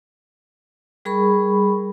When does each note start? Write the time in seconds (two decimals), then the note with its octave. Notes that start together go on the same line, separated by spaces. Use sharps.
1.05 G3 G#4 A#4 B5 C#6